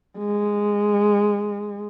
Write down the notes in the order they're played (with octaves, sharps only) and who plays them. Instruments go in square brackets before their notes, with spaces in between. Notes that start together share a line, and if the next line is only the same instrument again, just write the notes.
[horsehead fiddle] G#3